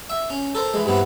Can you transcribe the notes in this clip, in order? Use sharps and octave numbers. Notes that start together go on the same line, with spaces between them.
E5
C#4
A4 A#4 C5
E3 G#3
G2 E3 B3 C4